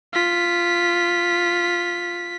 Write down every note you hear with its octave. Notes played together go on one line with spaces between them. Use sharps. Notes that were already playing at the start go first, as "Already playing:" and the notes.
F4 B6